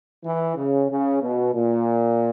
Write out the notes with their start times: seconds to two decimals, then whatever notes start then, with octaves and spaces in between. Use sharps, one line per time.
0.25 E3
0.57 C#3
0.89 C#3
1.21 B2
1.54 A#2